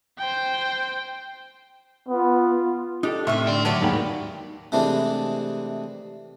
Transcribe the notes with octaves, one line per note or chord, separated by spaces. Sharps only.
C5 G5
B3 F4
D4 D#4 G4 A4
A2 C3 A3 E5 C#6 F6
D3 D5 G5 C6
F#3 B3 G4 D5 A5
D#2 G#2 F5 G5 B5
C3 E3 G#3 A3 D4